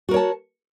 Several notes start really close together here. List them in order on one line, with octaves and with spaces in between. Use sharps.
F#4 A#4 C#5 A5